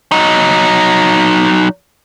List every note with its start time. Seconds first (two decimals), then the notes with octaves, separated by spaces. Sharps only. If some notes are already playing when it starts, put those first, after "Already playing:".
0.12 F#3 D#4